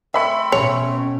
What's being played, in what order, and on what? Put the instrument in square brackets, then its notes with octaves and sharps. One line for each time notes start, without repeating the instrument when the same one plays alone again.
[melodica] A3 C4 [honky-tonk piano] E5 B5 C#7
[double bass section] B2 C#4 [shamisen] C#5